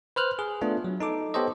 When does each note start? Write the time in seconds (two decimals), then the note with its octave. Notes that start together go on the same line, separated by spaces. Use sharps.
0.16 B4 C5 F6 F#6
0.39 G#4
0.61 A3 B3 D4 F4
0.85 F#3
1.00 D#4 A4 D6
1.34 B3 G4 A4 C5 C#5 D#5